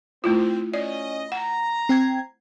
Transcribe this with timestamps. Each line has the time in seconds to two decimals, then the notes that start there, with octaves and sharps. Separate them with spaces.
0.24 A3 C4 E4 F4
0.74 C#4 D5 D#5
1.32 F#5 A#5
1.89 C4 G5 G#6